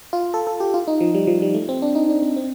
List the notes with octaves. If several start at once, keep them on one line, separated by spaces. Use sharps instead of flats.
F4
A4
A4
G4
F4
D#4
F3
G3
F3
G3
A3
C4
D4
D#4
D4
C4
C4